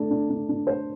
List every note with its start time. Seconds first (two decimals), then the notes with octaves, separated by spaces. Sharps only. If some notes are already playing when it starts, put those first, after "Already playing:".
Already playing: A3 D4
0.10 D4
0.30 D4
0.49 D4
0.67 C5